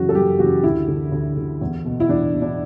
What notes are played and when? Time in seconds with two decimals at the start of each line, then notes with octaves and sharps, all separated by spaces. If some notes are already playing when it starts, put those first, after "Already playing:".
Already playing: F#2 C#3 E3 F#4
0.09 A4
0.15 F#2 G4
0.39 C#3 E3 F#4
0.63 D2 E4
0.88 D3
1.12 D2
1.37 D3
1.61 E2
1.85 B2
2.00 E4
2.09 E2 D4
2.34 B2
2.42 D4